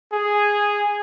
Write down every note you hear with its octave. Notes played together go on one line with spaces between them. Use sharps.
G#4